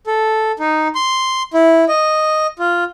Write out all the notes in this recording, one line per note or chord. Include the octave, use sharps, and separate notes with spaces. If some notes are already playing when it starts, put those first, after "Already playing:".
A4
D#4
C6
E4
D#5
F4